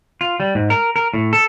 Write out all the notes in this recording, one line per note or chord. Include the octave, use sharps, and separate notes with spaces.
F4
G3
G#2
A#4
A#4
A2
A4